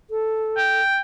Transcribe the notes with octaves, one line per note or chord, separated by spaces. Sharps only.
A4
G5